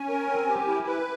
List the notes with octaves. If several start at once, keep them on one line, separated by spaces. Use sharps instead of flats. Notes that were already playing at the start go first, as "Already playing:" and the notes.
Already playing: C#4 G#5
A#4
C4
G4
E4
B4